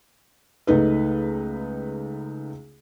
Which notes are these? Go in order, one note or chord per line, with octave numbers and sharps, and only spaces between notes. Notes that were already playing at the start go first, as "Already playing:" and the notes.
C#2 A3 D#4 B4